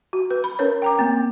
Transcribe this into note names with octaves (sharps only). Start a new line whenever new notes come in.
F#4
B4
B5
C#4 A#4 B4 C#5
G5 A#5 D6
A#3 C4